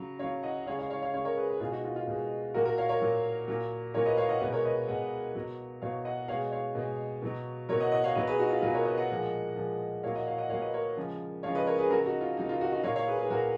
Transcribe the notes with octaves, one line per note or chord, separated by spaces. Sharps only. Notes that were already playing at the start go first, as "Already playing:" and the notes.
Already playing: C#3 F#3
C#3 F#3 C#5 F5
D#5 F#5
C#3 G#3 C#5 F5
C#5 F5
C#5 F5
C#5 F5
C#3 G#3 C#5 F5
A#4 C#5
G#4 B4
G#4 B4
B2 G#3 F4 G#4
D#4 F#4
F4
F4
B2 G#3
A#2 F#3 F#4 A#4
F#4 A#4
C#5 F5
A#4 C#5
A#2 F#3
A#2 F#3
A#2 F#3 A#4 C#5
B4 D#5
C#5 F5
D#5 F#5
B2 G#3 B4 D#5
A#4 C#5
B4 D#5
B2 G#3 D#5 F#5
B2 F#3
B2 F#3 C#5 F5
D#5 F#5
B2 C#5 F5
G#3
C#5 F5
B2 G#3
B2 F#3
B2 F#3 A#4 C#5
D#5 F#5
D#5 F#5
C#5 F5
B2 F#3 B4 D#5
G#4 B4
D#4 F#4
F4
B2 F#3 F4 G#4
A#4 C#5
B4 D#5
D#5 F#5
A#2 F3 G#3
A#2 F3 G#3
A#2 F#3 C#5 F5
D#5 F#5
C#5 F5
D#5 F#5
A#2 F#3 C#5 F5
B4 D#5
A#4 C#5
C#3 F3 G#3
C#3 F3 G#3 C#5 F5
B4 D#5
A#4 C#5
G#4 B4
C#3 F#3 F#4 A#4
D#4 F#4
F4
C#3 F#3 D#4
F4
D#4 F#4
D#4 F#4
A#2 F#3 C#5 F5
C#5 F5
G#4 B4
G#4 B4
A#2 F#3 F#4 A#4